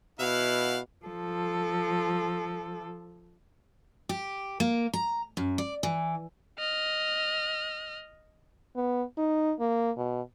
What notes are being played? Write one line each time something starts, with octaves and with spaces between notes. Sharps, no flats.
B2 E4 F5 F#5
F3 A4
G4
A#3
A#5
F#2
D5
E3
D#5 F6
B3
D#4
A#3
B2